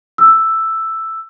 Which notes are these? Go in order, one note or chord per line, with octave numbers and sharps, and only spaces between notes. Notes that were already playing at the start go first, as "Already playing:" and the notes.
E6